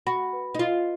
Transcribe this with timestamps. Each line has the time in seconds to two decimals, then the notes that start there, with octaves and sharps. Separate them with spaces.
0.07 F#4 B5
0.33 B4
0.54 D#4
0.59 F4 D#5